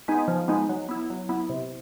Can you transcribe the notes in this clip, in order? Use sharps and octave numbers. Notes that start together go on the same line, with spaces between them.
G#3 B3 D#4
F3
G#3 B3 D#4
F#3
B3 E4
F#3
B3 E4
C3